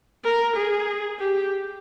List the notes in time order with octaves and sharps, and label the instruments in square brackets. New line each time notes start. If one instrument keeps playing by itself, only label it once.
[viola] A#4
G#4
G4